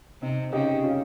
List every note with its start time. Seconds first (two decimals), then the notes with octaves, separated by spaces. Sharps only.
0.22 C3 C4 D#4
0.52 C#3 D#4 G4
0.83 C#4 F4